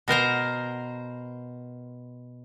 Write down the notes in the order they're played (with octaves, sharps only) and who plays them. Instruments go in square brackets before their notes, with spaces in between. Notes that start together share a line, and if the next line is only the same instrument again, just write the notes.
[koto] B2 A#4 C5 A#5